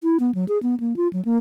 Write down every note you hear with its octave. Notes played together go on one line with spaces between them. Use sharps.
E4
B3
F#3
G#4
B3
A#3
F4
F#3
A#3